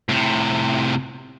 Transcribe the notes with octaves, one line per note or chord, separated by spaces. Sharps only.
A2 C3